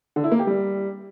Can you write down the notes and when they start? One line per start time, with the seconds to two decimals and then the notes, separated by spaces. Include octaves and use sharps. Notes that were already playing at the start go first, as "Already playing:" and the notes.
0.16 D3
0.24 E4
0.32 A#3
0.39 G4
0.47 G3